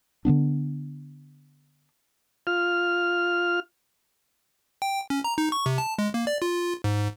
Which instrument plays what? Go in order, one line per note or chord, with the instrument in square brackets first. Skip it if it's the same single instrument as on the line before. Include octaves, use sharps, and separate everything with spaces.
[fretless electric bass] D3 F3 B3 D4
[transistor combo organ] F4 F6
[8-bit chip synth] G5
C#4
A#5
D#4
C#6
C3
A5
G#3
A#3
D5
F4
G#2